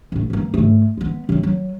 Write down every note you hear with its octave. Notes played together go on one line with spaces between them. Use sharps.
A1 A2
G2 A#3
G#2 A3
G#3 B3
F#2 C4
F#3